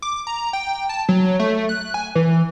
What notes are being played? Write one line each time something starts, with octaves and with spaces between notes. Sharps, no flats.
D6
A#5
G5
A5
F#3
A3
F#6
G#5
E3